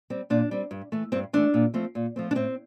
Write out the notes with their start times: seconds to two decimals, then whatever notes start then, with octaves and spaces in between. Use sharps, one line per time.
0.10 G3 C4
0.30 A#2 D4
0.51 G3 C4
0.71 G2
0.92 E3 A3
1.12 G2 C4
1.33 E3 A3 D4
1.54 A#2
1.74 F3 A3 C4
1.95 A#2
2.16 F3 A3 C4
2.31 D4
2.35 A2 C4